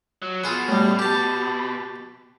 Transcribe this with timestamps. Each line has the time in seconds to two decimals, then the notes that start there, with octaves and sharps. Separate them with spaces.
0.22 F#3
0.44 B2 F4 G#4 F#5
0.68 A2 G3
0.99 G4 A5